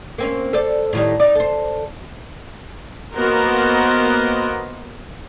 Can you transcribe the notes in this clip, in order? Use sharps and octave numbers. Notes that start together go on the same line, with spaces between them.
A#3 C4 C#4
A4 C5 D5
A2 D#3 G3
D#4 D5
A4 C5
A#3 B3 F#4 A#4 C5 D#5